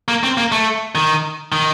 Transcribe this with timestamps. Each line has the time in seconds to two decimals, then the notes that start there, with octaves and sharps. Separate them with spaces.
0.08 A#3
0.23 C4
0.38 A#3
0.52 A3
0.95 D#3
1.52 D#3